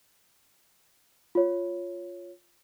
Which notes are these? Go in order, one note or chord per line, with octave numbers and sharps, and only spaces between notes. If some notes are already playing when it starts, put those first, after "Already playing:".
F4 C#5